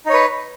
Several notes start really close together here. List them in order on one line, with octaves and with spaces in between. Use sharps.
D#4 C#5 B4